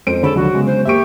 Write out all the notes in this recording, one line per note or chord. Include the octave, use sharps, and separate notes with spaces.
F2 C5 D7
D3 G#3 A4 C#5 B5
C#2 D3 F3 F#3 F#4
C#3 G#3 B3
C5
D#2 A#3 G4 E5 C#6 D7